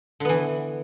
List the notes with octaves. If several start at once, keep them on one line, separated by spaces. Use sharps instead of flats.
D3 E3 B3